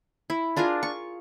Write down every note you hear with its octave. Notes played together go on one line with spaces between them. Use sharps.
E4
D4 F4 G#4 A#4
C#6